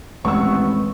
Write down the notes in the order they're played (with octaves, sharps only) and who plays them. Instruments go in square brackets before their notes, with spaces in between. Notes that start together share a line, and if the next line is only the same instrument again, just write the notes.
[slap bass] D#1 G#3 C4 [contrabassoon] A1 [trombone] B3 [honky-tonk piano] C#6 E6